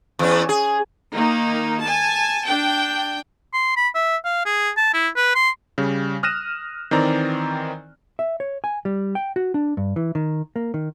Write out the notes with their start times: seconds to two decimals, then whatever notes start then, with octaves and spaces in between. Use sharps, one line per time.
0.19 E2 C#4
0.49 G#4
1.13 D#3 A#3 D#4
1.81 G#5 A5
2.46 D4 G5
3.53 C6
3.76 B5
3.95 E5
4.25 F5
4.46 G#4
4.77 A5
4.93 E4
5.16 B4
5.35 C6
5.78 C#3 G3
6.23 D#6 F6 F#6 A#6 D#7 E7
6.91 D#3 E3 C4 D5 A#5
8.19 E5
8.40 C#5
8.64 G#5
8.85 G3
9.15 G5
9.36 F#4
9.54 D4
9.77 G2
9.96 E3
10.15 D#3
10.56 A#3
10.74 D#3